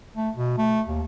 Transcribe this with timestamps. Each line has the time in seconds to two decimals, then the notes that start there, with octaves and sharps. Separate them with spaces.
0.16 A3
0.36 B2
0.58 A3
0.87 D#2